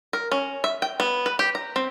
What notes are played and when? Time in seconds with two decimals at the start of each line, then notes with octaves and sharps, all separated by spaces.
0.13 A#4
0.32 C#4
0.64 E5
0.82 G5
1.00 B3
1.26 B4
1.39 G4
1.55 A#5
1.76 C4